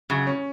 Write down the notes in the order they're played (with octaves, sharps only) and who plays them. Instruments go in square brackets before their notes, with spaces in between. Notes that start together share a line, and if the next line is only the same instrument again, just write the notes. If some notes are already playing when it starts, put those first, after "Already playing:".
[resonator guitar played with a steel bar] F#2 C#3 F#3
[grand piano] C#4